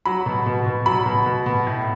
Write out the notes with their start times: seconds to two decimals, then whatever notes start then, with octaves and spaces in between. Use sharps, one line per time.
0.05 F#3 B5
0.26 B2
0.46 B2
0.66 B2
0.86 F#3 B5
1.06 B2
1.26 B2
1.46 B2
1.67 A2